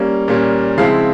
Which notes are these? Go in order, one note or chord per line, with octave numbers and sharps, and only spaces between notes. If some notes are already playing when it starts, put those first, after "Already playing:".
Already playing: G3 A#3 C#4
A#2 G3 A#3 C#4
C#3 F3 G#3 C4 E4 F5